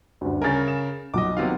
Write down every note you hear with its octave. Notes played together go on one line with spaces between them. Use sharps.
D2 G2
C#3 A#4 G#5 A6
E7
B1 F3 D#5 D6
C3 D#3 F#3 B3 F4 F5